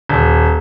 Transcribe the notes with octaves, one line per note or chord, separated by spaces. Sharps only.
D#1